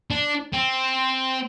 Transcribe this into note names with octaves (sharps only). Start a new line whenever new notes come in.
D4
C4